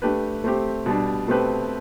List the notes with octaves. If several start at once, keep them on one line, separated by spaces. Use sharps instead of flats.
A3 D4 G4 B4
A3 C4 G4
B2 G3 D4
B2 A3 C4 G4 B4